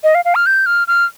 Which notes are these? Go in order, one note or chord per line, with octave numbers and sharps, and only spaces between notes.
D#5
F5
F5
F6
G6
F6
F6